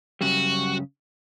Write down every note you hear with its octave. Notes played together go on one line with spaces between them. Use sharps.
F#2 C#3 G3 F#4